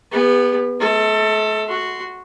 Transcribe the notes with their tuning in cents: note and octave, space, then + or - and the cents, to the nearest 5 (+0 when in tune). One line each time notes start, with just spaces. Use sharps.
B3 +0 G#4 -45
A3 -40 A4 +20
F#4 -5 C6 -15